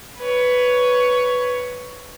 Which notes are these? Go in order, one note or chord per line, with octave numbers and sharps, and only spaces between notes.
B4 C#5